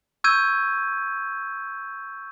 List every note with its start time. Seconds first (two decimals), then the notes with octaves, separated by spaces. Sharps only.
0.24 C#6 E6 G6 G#6 D#7